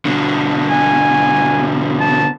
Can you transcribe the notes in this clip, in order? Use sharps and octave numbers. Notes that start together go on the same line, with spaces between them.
B2 D3
G#5
A5